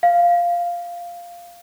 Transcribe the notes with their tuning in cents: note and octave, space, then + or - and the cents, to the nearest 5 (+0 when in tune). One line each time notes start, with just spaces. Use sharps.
F5 -5